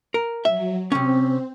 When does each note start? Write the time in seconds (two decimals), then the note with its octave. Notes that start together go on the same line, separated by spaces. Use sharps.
0.14 A#4
0.45 F#3 E5
0.92 C3 C4 C#4